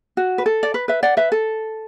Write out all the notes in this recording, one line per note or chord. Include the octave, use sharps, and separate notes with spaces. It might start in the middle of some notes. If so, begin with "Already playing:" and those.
F#4
B4
A4
D5
B4
B4 E5
D5 F#5
B4 E5
A4